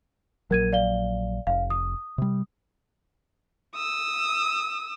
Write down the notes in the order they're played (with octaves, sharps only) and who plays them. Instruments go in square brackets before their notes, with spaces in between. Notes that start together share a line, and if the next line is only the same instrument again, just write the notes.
[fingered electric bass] A#1 F#3 [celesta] A#4 G#6 D#7
[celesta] D5 F5 G7
[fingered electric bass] F1 [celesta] F5
[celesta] D#6
[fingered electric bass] C3 G3
[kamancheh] D#6 E6